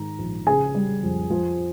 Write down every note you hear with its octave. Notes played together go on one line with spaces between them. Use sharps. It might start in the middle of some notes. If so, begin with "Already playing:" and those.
Already playing: G#2 D#3 A#5
A#1
C#3 G#4 G#5
G3
F2
F3